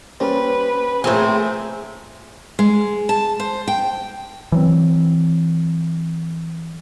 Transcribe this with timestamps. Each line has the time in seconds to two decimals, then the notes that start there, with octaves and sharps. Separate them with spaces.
0.20 G3 A#3 C#4 B4 C5
1.04 A#1 A2 A3 C4 G#4 E5 G#5 A#5
2.59 G#3
3.09 A5
3.40 C5
3.68 G5
4.52 E3 F#3 C4